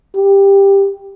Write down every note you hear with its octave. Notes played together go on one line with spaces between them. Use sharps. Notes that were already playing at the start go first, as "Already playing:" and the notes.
G4